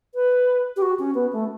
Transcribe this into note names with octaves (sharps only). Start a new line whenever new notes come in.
B4
G4
F#4
C#4
B3
A3